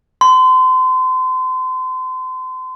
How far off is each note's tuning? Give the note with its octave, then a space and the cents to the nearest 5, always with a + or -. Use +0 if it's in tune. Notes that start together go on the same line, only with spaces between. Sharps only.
C6 -35